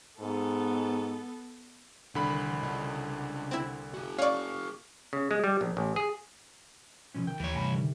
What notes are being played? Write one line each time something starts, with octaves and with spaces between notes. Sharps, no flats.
G#2 B3 A4
C2 D3 D#3 B5
C#3 D#5
C4 E4
F#4 G#4
C#4 D5 F5 C#6
C#3
G#3
G3
A#1
A1
G#4
B2 F3 C#4
D#3 G5
D#2 E3 C#5
G2 C3 G3 G#5 B5
D3 D#3